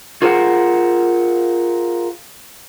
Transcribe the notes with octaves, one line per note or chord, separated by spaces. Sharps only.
F4 G#4 A#4 C5 F5 F#5